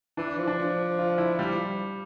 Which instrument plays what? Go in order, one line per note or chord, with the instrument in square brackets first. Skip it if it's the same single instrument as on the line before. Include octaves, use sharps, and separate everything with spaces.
[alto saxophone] E3 [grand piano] D4
[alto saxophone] F3
[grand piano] D4
[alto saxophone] F3
[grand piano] F4
E4
G3